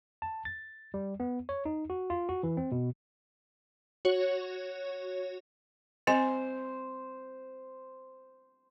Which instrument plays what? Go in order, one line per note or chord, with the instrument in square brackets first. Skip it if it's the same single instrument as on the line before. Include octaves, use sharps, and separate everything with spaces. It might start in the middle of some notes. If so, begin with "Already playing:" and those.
[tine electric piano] A5
A6
G3
B3
C#5
D#4
F#4
F4
F#4
E3
C4
B2
[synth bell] F#4 C#5
[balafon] C4 D#5 G#5 [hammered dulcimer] C5